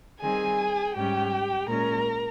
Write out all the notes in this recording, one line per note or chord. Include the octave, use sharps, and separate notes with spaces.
D#3 G3 C4 G#4 G#5
G#2 G3 C#4 G4 G5
A#2 G#3 C#4 A#4 A#5